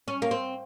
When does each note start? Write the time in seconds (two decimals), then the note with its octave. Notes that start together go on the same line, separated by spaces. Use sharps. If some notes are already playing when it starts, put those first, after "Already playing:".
0.08 C#4
0.22 A#3
0.31 C4